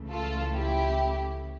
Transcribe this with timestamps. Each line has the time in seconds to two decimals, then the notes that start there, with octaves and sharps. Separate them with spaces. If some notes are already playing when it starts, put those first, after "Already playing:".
Already playing: C#2 C#3 E3 A3
0.10 F4 A4
0.55 E4 G4